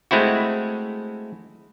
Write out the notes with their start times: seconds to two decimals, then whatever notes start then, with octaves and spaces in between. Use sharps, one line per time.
0.11 G#3 A3 C4 E4 F#4